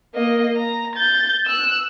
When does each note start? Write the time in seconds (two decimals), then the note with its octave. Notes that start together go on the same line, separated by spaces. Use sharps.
0.14 A#3 D#5
0.56 A#5
0.96 G6 A6
1.46 E6 F#6